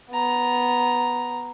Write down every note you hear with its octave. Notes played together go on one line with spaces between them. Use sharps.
B3 A#5